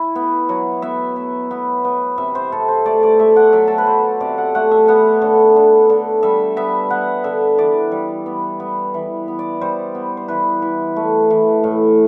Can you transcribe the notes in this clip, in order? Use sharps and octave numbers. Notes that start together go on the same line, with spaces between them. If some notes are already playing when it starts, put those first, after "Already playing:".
Already playing: E4
B3
F#3
B3 E5
B3
B3
B3
C3 E5
C5
C3 A4
C5
A3 D5
D5
A3 E5
F#5
F#3 E5
A4
B4
F#3 C5
C3 D5
F#5
A3 F#5
E5
B3 F#5
D3
D3
D3
G3 E5
B3 E5
B3 F#5
D3 E5
E3 D5
G3
B3
B3
E3
B3
D5
G3 C5
B3
C5
E3 B4
E3
A3
E3
A2